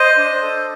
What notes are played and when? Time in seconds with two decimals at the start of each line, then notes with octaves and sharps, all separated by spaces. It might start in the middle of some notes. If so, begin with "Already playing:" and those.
Already playing: C5 D#5
0.18 D4
0.42 A4